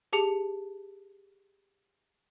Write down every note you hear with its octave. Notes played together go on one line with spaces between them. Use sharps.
G4 G#4 A5 D6 C#7 F7